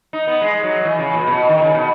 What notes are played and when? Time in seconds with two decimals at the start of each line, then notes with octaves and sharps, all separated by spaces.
0.13 D#4
0.27 B3
0.41 G#3
0.64 F#3
0.85 E3
0.99 C#3
1.14 A#2
1.27 B2
1.49 D#3
1.62 C#3
1.74 B2